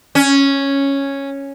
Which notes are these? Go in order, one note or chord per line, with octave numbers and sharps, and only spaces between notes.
C#4